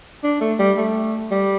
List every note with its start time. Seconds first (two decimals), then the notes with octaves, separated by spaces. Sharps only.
0.24 D4
0.41 A3
0.59 G3
0.78 A3
1.31 G3